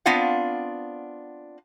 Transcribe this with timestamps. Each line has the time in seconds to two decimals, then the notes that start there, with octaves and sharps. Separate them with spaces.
0.06 B3 C4 D4 F4 F5 F#5